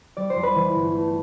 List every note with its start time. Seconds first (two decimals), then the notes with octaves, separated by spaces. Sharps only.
0.17 G3 D5
0.30 C5
0.36 F2
0.43 B4
0.55 E3
0.75 G1
0.94 A3